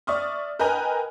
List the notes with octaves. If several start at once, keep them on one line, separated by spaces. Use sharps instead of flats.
D5 E5 C#6 D#6 F6
A#4 B4 D#5 G5 G#5 A#5